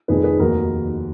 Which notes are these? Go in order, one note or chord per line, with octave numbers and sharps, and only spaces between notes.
F1 F2 D#3 G#4 B4
G#4 B4
F1 D#2 D#3 F#4 A#4